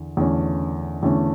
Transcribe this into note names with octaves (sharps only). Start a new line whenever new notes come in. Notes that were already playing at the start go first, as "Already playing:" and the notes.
Already playing: E2 D3
E2 D3 A3 C#4
E2 D3 A3 C#4